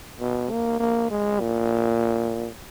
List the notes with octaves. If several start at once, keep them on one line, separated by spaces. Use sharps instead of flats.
B2
A#3
A#3
G#3
A#2